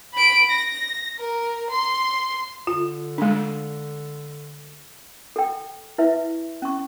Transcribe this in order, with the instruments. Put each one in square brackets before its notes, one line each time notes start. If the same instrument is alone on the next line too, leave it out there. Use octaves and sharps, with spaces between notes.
[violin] B5 D7
A#6
A#4
C6
[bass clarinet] D3 [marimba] F4
[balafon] G#3 D4
[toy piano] A4 G5
E4 B4 E5
C#4 C#6